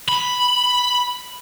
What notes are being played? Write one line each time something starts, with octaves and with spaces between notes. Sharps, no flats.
B5